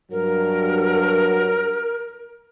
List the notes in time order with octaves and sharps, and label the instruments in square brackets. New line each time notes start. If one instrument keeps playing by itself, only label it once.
[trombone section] G2 F#3 [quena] A#4